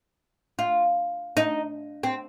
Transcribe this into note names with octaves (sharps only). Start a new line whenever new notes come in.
F4
D#4
C4